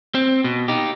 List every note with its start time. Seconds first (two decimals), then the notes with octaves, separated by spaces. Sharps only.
0.15 C4
0.44 B2
0.68 D#4 G4